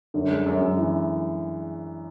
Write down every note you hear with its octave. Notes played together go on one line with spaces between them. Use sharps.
F#2 D3
G#3
F#2
F#2
E3